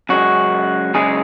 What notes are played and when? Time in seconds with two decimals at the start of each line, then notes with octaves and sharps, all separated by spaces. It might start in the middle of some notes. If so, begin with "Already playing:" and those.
0.09 F#2 C#3 G#3 F#4
0.94 F#2 C#3 G#3 G#4